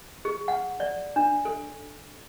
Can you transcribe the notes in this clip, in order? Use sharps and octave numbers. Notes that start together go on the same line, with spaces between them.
G#4
F#5
D5
D4
A4